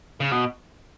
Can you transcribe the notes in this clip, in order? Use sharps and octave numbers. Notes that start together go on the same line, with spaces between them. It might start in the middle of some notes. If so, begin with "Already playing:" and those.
C#3
B2